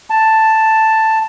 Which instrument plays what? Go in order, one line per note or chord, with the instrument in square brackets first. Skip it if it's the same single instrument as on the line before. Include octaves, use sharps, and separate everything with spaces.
[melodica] A5